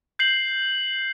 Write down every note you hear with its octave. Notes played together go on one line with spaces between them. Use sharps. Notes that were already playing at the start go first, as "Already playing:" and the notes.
G6 C7 F#7